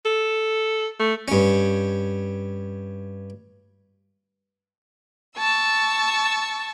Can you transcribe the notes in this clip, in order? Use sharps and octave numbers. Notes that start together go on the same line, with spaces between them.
A4
A3
G2 C#4
A5 C#6 E6